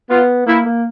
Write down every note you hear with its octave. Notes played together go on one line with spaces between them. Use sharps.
B3 F4
A#3 E4
A#3